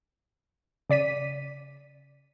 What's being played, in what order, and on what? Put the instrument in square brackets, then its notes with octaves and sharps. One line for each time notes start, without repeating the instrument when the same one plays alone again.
[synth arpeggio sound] C#3 D5 B6 D#7